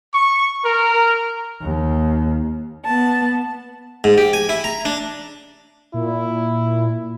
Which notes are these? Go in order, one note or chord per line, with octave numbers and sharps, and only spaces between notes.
C#6
A#4
D#2
B3 A5
G#2
G4
G#5
E4
A#5
D4
A#2 E4